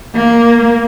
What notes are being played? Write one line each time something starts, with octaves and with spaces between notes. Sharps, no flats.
A#3